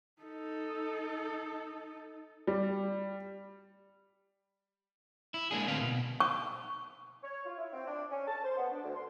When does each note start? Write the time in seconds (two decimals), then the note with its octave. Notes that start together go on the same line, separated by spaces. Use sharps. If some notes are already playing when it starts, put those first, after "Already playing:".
0.22 D#4 A4
2.47 G3
5.34 E4
5.51 G#3 A#3 D4 G#4
5.68 A2 D3 C4 B4 F5
5.81 B2
6.20 C#6
7.23 C#5
7.45 F4
7.58 E4
7.73 C4
7.87 D4
8.10 C#4
8.27 A5
8.44 C5
8.57 B3
8.72 D4
8.83 D2
8.95 C6